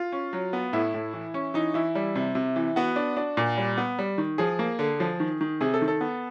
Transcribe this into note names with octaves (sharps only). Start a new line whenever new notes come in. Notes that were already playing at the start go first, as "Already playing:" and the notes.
Already playing: F4
C#4
F#3
B3
A2 E4
A2
E3
C#4
E3 D#4
E3 E4
G3
C3
C3
E3
B3 F#4
D4
D4
A#2
G3
B3
G3
D#3
F3 G#4
A#3
D3
F3
D#3
D#3
C3 G#4
A4
D#3
A4
B3